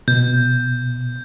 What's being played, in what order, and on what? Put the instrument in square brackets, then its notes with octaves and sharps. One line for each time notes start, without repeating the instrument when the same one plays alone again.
[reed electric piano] B2 [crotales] G6